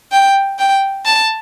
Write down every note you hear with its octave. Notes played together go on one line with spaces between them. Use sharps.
G5
G5
A5